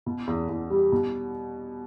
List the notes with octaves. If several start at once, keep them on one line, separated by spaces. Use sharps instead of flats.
B2
E2
E2
G3
B2